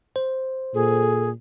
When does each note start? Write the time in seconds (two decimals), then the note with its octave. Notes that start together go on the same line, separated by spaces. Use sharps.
0.16 C5
0.74 A#2 G#4 A4